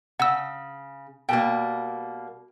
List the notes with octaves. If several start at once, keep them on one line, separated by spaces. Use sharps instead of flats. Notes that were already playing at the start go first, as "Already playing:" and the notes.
C#3 F#5 E6
B2 G3 A#3 F#4 G5